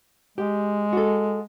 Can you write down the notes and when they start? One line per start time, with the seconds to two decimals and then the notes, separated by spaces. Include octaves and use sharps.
0.38 G#3 G4
0.93 F#4 A4